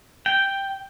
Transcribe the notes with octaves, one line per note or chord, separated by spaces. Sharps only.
G5